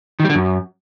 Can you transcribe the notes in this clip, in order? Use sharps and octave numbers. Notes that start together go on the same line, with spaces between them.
D#3
G3
D3
F#2